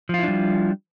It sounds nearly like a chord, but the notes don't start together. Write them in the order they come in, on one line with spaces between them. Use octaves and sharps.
F3 F4 E4 D4 G3